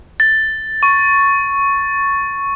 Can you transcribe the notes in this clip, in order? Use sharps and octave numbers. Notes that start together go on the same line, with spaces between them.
A6
C#6